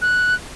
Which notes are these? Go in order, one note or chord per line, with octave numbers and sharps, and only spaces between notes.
F#6